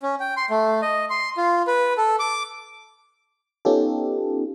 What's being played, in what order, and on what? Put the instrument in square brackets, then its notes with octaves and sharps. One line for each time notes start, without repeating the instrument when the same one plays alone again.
[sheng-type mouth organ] C#4
G5
C6
A3
D#5
C6
F4
B4
A4
D6
[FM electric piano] B3 C#4 D#4 F4 G4 A4